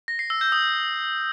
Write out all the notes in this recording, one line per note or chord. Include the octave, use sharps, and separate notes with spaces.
A#6
C7
E6
G6
D#6